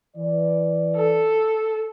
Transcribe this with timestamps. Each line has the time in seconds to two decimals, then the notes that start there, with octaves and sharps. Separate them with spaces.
0.17 E3 D5
0.95 A4